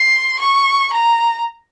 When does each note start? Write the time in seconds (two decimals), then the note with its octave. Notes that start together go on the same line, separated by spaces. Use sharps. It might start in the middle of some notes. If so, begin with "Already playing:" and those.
Already playing: C6
0.39 C#6
0.93 A#5